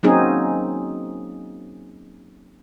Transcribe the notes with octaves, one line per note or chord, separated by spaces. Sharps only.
F#3 A#3 C4 C#4 D#4 G#4